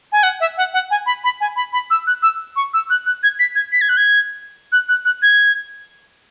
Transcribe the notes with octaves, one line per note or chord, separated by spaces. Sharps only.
G#5
F#5
E5
F#5
F#5
G#5
B5
B5
G#5
B5
B5
E6
F#6
E6
C#6
E6
F#6
F#6
G#6
B6
G#6
B6
G#6
F#6
G#6
F#6
F#6
F#6
G#6